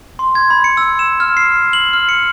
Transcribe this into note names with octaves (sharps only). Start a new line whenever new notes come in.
C6
G#6
B5
C#7
E6
E7
F6
C7
F#7
F6
C#7